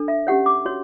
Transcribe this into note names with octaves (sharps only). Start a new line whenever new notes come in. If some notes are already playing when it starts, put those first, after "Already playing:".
Already playing: D4 A4
E5
C#4 G4 C#5 F#5
D6
F#4 C#5